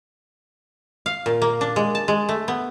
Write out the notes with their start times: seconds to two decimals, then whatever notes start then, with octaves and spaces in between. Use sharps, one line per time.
1.06 F5
1.26 A#2
1.42 A#3
1.61 D4
1.76 G#3
1.95 A5
2.08 G#3
2.29 A3
2.48 B3